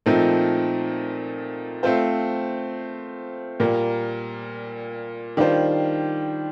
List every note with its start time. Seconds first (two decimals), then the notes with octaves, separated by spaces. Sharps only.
0.06 A#2 F3 A3 C4 D#4
1.83 A3 C4 F4 C5
3.60 A#2 G3 A#3
5.37 D#3 G3 D4 F4 C5